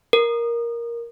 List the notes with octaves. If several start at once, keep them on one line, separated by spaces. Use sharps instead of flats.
A#4